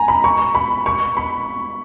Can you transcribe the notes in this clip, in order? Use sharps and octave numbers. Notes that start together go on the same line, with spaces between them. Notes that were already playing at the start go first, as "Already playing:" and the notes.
Already playing: G#5 A#5
B5
C#6
B5
C#6
B5